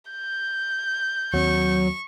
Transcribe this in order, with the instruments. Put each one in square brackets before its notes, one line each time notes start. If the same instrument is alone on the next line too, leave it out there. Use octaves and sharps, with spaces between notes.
[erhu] G6
[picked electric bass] D#2 C4 [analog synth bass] F#3 [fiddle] C#6